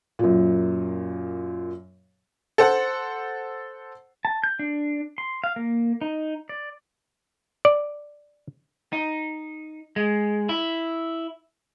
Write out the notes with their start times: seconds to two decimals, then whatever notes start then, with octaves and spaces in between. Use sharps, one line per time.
0.19 F#2 A#2
2.58 A4 C5 F#5
4.25 A5
4.44 G6
4.59 D4
5.18 C6
5.44 F5
5.56 A#3
6.01 D#4
6.49 D5
7.65 D5
8.93 D#4
9.96 G#3
10.49 E4